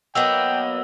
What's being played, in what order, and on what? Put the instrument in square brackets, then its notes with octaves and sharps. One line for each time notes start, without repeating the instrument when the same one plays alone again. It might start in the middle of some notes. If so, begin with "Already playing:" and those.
[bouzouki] F#3 A#3 B3 [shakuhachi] D#5 [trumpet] G5 [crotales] E6 G7